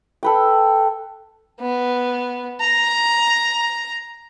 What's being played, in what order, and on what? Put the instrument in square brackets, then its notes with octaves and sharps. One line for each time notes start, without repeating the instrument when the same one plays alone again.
[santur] A4 B4 G5
[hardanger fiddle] B3
A#5